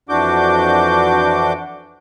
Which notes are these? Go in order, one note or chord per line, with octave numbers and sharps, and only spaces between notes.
F2 E3 D4 F#4 D6 G6